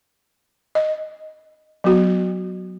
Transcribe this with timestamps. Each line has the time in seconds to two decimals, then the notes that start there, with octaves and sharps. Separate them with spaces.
0.75 D#5
1.84 F#3 B3 F#4